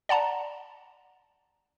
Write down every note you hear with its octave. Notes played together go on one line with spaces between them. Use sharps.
D5 F#5 A5 A#5